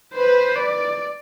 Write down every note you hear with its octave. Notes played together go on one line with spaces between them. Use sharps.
B4 C5
D5